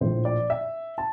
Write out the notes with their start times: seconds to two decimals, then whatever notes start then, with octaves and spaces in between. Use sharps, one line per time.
0.01 A#1 A2 F3 C5
0.25 D5
0.50 E5
0.98 A5